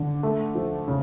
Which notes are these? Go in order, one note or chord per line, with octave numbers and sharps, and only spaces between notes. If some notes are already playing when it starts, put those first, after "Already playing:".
Already playing: D3
A3
F3
C#3